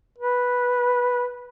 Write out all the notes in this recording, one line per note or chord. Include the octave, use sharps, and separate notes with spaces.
B4